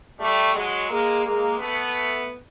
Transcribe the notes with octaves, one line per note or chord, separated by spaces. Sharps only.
G3 A3
F#3 G#3
G#3 A#3
G#3 A#3
A3 B3